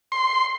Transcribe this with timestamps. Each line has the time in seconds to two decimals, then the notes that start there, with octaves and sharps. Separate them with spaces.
0.12 C6